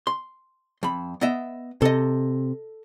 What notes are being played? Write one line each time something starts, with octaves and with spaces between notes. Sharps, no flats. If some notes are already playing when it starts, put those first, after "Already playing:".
C6
F2 B5
B3 D#5 E5
C3 A4 D#5